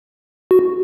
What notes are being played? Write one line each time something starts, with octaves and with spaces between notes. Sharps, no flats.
F#4